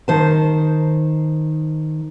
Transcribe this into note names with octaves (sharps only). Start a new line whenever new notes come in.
D#3 C5 A5